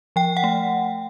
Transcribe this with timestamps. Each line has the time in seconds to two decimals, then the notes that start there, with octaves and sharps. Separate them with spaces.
0.16 F3 G5
0.37 F#5
0.44 A3